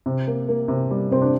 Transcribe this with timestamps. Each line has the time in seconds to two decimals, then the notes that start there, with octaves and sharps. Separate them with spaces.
0.06 C3
0.27 A#3
0.48 A#3
0.68 C3
0.90 G3
1.11 C3 C4
1.22 D4